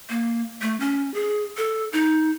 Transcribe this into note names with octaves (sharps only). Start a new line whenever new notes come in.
A#3
A3
C#4
G#4
A4
D#4